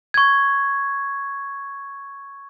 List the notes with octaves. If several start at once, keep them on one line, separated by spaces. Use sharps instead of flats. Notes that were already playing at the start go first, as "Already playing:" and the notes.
C#6 G#6